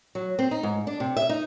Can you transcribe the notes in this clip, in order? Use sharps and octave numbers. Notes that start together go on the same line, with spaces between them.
F#3
C4
D#4
G#2
D4
C3
E5
D#4